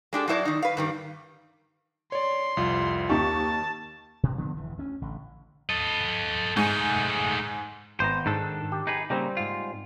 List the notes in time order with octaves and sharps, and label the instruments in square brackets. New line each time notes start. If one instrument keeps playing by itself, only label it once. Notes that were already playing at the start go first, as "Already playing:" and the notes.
[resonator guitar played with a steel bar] G#3 D4 G4 A4
F#3 D4 E4 C5 D5 D#5
D#3 D#4
B4 F5
G2 D#3 G3
[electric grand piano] C#5 D5 [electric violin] C6
[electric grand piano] C2 F2 F4
[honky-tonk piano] D#2 D#4 C#6 [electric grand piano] G4 [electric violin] A5
[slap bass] B2
C#3 F3 B3 C4
E1 E2 G#2 E3
D2 C#4
A1 D3
[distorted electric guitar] A4 D#5
[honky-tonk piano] G#2 [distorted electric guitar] A3 D#4
[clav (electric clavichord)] G#1 B3 A#5 [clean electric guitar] C5
[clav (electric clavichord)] G#2 [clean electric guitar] D#3 D4 A4
[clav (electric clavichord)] G4
[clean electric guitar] D#4 G#4 B4
[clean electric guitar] C#3 A#3 D#4 [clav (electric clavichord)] G3 C4
[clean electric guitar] G#2 F4